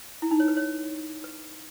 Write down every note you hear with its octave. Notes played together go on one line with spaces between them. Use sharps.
E4
D#4
C#5
B4
C#5
B4